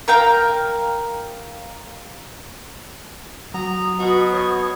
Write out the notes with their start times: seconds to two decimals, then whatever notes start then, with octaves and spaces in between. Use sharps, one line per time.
0.08 A#4 F5 G5 A#5
3.54 F#3 A#5 D#6
4.00 B2 F#4
4.32 C#5